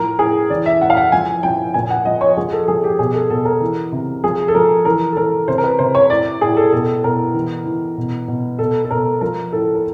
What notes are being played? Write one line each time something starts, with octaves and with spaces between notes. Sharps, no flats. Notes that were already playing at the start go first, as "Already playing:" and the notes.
Already playing: A2 F3 A#4
A2 G#4
E3 D5
E5
A2 F#5
F5
F#5
F3 G#5
F3 G5
A#2 G#5
F#5
F3 D#5
C#5
F3 G#4
A4
F3 G#4
G4
B2 G#4
A4
B2 A4
A#4
E3
C3
F3 G#4
A4
F3 A#4
E3 A#4
A4
E3 A#4
C3 C5
A#4
B4
C3 C5
C#5
A2 D5
A2 G#4
A4
B2 A4
B2 A#4
E3
E3
B2
B2
B2 A4
A4
B2 A#4
F3 A#4
A2 A4
A#4